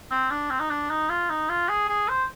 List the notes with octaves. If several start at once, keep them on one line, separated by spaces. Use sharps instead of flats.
C4
D4
C4
D#4
D4
D#4
F4
D#4
F4
G#4
G#4
C5